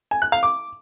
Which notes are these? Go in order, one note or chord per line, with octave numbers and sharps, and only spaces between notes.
G#5
F#6
F5
D6